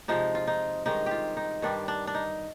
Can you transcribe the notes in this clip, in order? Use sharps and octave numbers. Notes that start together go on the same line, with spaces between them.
C3 F3 G#3 D#4
F4
D#4
G2 D#3 G#3 D#4
F4 G4
D#4
G2 D#3 G3 D4
D4
D4
D#4